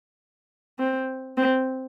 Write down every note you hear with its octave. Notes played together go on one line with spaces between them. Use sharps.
C4
C4